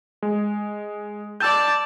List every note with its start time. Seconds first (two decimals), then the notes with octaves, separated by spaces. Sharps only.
0.22 G#3
1.40 D5 A5 E6 G6